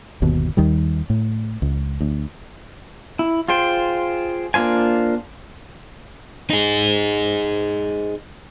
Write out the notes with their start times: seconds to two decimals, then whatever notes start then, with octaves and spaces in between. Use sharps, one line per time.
0.22 G1 D#2 B2
0.57 D#2 D#3 G3
1.10 A2
1.62 C#2
2.01 D2
3.19 E4
3.48 F4 G#4 C5 G5
4.54 A#3 D4 F4 C5 G#5
6.50 D#4 G#4